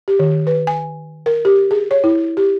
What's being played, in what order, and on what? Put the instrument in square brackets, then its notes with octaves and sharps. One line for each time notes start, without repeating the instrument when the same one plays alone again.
[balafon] G4
D#3
B4
G#5
A#4
G4
G#4
C#5
E4
G4